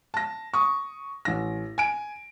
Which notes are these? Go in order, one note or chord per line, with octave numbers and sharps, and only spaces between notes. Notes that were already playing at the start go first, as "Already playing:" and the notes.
A5 A#6
C#6 D#6
A1 A#6
G#5 D7